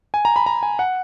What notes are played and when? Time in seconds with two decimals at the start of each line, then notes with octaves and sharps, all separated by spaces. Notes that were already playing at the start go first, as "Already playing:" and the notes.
0.14 G#5
0.25 A#5
0.36 B5
0.46 A#5
0.63 G#5
0.79 F#5